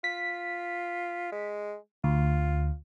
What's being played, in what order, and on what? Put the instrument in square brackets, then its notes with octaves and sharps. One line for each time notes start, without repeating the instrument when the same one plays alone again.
[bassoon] F4 [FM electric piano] B6
[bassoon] G#3
[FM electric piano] D2 [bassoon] F4